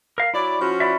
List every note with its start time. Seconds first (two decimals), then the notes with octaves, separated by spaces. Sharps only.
0.18 A#4 F5
0.34 F#3 E4 D5
0.60 F3 C#4 F#4
0.80 E4 D5 E5